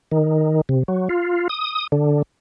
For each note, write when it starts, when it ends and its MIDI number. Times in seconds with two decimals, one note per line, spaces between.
0.12 0.61 51
0.69 0.83 48
0.88 1.08 54
1.09 1.48 65
1.49 1.87 87
1.92 2.22 50